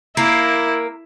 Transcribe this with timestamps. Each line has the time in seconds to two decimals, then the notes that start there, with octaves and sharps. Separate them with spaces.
0.17 A#3 E4